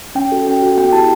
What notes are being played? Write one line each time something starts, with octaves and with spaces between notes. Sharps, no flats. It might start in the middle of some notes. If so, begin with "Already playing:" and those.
C#4 G5
F#4 A4
C#4 G5
F#4 A4
B3 G5
E4 G4 A5